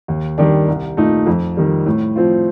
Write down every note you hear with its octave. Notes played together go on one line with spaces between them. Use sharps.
D#2
D#3 G3 D4 G4
C2
A#2 A3 D#4
F2
D#3 G3
A2
F3 C4 F4